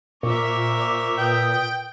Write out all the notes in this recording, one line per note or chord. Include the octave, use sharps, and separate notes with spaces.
A#2 A#4 C5 E5 C#6 D6
B4 G5 D#6